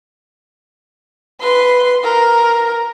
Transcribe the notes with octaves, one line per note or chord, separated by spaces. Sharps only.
B4 C6
A#4